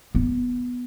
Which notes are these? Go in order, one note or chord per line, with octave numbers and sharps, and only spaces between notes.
B3